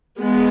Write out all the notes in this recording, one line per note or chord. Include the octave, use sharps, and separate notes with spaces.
G#3 B3